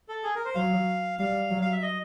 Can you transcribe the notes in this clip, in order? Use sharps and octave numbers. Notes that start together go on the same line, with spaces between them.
A4
G#4
A#4
C5
F#3 F5
G3 F5
F#3
F5
E5
D#5